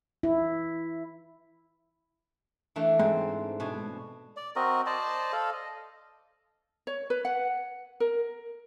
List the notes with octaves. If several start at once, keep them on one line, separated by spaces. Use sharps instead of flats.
E4
E3 A3 D4
G#2 C4
B2 D4 G#5
D5
C4 F#4 A#4 D#5
C5 D5 D#5 A5
A4 F5
D#5
C#5
B4
F#5
A#4